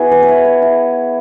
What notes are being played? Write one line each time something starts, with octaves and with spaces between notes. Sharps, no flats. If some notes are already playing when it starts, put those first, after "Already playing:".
Already playing: B3 E4 F#4 G#4
B4
B4
E4 C#5
C#5
E4